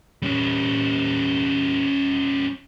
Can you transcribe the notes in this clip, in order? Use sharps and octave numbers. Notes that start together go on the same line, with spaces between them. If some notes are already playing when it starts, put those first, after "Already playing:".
G3 C#4